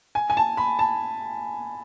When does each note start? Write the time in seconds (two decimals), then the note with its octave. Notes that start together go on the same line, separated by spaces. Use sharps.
0.15 G#5
0.30 G#5
0.37 A5
0.57 B5
0.79 A5